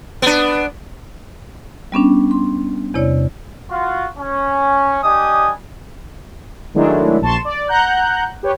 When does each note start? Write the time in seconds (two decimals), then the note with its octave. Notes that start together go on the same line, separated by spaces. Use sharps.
0.22 B3 D4
1.92 G3 B3 C#4 D4
2.31 C6
2.94 E2 C3 E4 C#5 D5
3.70 F4 F#4
4.18 C#4
5.04 G3 D4 G4 D#5 G#5 D#6
6.74 D#3 F#3 G#3 A3 D4 E4
7.21 A#1 A5 C6 C#6 E7
7.45 D5
7.68 F#5 A#5 F#6 G6
8.43 G4 B4 C#5